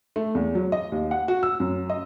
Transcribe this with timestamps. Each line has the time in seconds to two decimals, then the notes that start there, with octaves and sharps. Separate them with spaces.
0.16 A3
0.35 E2
0.55 F#3
0.72 D#5
0.92 D#2
1.11 F#5
1.28 F#4
1.43 E6
1.60 F#2
1.90 D#5